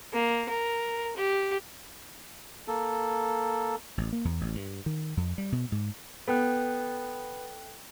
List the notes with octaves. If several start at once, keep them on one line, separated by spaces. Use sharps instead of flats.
A#3
A#4
G4
A#3 A4
A1
A#3
E2
A1
G2
D#3
F2
G3
B2
G#2
B3 A4 G5 F#6